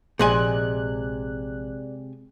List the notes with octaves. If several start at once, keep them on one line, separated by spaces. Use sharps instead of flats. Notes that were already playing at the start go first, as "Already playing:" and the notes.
A#1 C3 G#3 G#4 D5 G#5 F#6